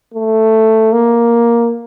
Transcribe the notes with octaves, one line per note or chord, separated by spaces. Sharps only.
A3
A#3